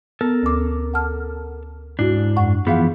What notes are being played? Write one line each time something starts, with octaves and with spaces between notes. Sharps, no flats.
B3 A4 A#4
D2 D6
F#5 A5 F6
G#2 D4 E4 F#4
F#2 F#5 C#6
E3 F3 B3 G#4 F5 F#5